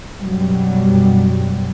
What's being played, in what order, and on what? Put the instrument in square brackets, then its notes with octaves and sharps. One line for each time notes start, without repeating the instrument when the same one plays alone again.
[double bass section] F#2 B2 F#3 G3